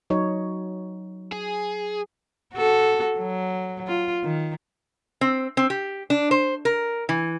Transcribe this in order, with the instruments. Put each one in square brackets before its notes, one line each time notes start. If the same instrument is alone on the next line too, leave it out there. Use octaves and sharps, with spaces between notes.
[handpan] F#3 D#4 C#5
[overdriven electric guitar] G#4
[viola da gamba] F#4 A4
F#3
F4
D#3
[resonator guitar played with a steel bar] C4
C4
G4
D4
C5
A#4
E3